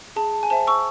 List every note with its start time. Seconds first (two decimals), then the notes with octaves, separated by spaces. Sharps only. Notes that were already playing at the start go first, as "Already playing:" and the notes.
0.16 G#4 A5
0.34 A5
0.43 G#5
0.50 C5 E5 A5
0.67 C#6 E6